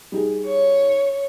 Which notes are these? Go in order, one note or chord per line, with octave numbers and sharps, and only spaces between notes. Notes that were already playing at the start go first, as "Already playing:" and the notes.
G3 D#4 G#4
C#5